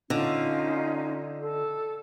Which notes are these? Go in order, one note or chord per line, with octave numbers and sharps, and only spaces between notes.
D3 C#4 D#4 F4
A4